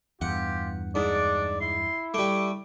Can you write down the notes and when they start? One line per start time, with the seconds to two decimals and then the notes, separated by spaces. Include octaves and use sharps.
0.21 E2 G2 F4 G4 F#5
0.95 G#2 D4 D5
1.61 E4 C6
2.14 G3 A3 D6